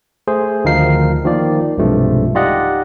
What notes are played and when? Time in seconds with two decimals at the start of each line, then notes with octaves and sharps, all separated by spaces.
0.28 A3 G#4 C5
0.65 D2 D#3 F3 D#4 F5 C7
1.25 D#3 F3 A#3 F4 D5
1.78 B1 G2 C3 F3 G#3 A3
2.35 D#4 F4 G4 D5 D#5 F#5